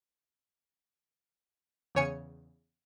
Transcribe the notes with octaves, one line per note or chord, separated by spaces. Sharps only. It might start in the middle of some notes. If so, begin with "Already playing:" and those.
E2 C#3 C#5 G#5 C#7